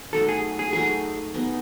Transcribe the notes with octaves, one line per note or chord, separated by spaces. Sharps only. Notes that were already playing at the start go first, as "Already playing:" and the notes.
Already playing: C#4
F#3 A3 D#4 F#4 A4
G#4
G#4
F#3 A3 D#4 F#4 G#4
F#3 B3 D#4 G#4